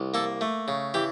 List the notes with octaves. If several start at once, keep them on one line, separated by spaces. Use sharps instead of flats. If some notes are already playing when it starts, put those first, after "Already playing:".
Already playing: C2
A#3 A4
A3
C#3
E3 G4